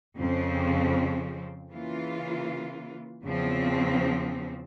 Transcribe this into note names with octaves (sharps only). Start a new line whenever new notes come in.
F2 C#3 F3 C4
C#3 E3 A#3 F4
E2 C#3 F3 C4